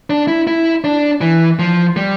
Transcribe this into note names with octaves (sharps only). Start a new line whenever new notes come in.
D4
E4
E4
D4
E3
F3
G3